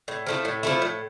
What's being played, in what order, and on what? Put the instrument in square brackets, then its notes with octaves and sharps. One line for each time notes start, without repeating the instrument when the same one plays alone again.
[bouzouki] A2
F3 A3 E4
A2
F3 A3 E4
A2